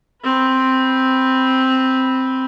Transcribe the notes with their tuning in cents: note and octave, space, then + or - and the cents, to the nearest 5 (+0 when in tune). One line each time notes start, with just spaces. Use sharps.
C4 +0 B4 +0